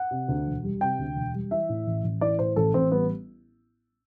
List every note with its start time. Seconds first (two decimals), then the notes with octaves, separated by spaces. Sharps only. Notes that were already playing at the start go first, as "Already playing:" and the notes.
Already playing: F#5
0.11 C3
0.28 D2
0.46 E1
0.64 G3
0.81 C3 G5
0.99 D2
1.16 E1
1.34 G3
1.51 E3 E5
1.69 A2
1.86 A1
2.04 A1
2.21 E3 D5
2.39 A2 C5
2.56 A1 A4
2.74 A1 C4
2.92 G3 B3